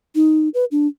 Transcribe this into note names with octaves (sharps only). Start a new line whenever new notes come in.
D#4
B4
D4